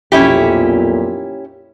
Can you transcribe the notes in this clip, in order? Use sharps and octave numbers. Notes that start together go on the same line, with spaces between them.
B1 F2 A#2 C#4 E4 G4